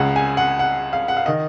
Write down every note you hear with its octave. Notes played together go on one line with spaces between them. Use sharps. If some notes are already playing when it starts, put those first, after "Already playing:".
Already playing: C#2 C#3 F#5
G#5
F#5
F#5
F5
F#5
F5
D#3 D#5